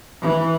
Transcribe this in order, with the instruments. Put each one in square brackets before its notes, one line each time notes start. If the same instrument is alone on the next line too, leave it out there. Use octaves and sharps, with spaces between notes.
[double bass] E3